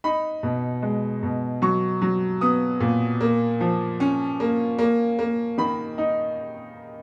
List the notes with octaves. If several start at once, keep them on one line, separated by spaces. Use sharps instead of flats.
D#4 B5
B2
G#3
B2
F#3 C#6
F#3
B3 D#6
A#2
A#3
F3
C#4
A#3
A#3
A#3
D#3 B5
D#4